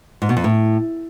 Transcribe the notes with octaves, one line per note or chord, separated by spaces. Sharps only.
G#2
B2
F2
A2